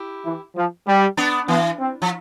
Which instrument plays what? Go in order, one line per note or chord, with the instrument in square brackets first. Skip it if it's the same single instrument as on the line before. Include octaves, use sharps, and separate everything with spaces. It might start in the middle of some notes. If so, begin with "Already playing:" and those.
Already playing: [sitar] E4 G4
[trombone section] E3
F3
G3
[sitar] B3 D4
[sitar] E3 [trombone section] B3
[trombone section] C4
[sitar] F3